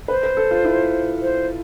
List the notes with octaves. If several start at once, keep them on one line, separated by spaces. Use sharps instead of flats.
B4 C5
B4
A4
F4
E4
C5